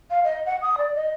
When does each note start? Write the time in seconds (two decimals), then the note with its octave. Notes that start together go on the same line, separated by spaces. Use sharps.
0.11 F5
0.24 D#5
0.46 F#5
0.62 D#6
0.78 D5
0.95 D#5